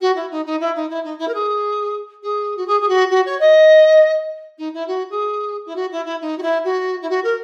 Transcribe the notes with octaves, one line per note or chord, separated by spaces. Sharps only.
F#4
E4
D#4
D#4
E4
D#4
E4
D#4
E4
A#4
G#4
G#4
F#4
G#4
G#4
F#4
F#4
C#5
D#5
D#4
E4
F#4
G#4
E4
F#4
E4
E4
D#4
F#4
E4
F#4
E4
F#4
A#4